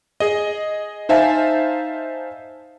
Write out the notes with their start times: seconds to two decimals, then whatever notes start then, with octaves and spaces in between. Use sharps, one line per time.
0.20 G#4 D#5
1.09 D#4 C5 E5 F5 G#5 A5